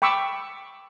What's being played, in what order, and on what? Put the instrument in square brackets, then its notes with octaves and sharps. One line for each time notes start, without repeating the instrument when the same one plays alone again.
[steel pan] G5 B5 C#6 D6 E6